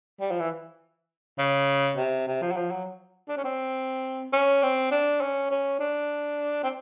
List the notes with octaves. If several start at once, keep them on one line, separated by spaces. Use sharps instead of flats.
G3
F3
E3
C#3
C3
C3
F3
F#3
F3
F#3
D4
C#4
C4
C#4
C4
D4
C#4
C#4
D4
C4